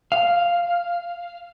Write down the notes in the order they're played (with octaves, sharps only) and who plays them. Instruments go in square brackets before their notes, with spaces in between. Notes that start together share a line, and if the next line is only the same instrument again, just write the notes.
[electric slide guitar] F5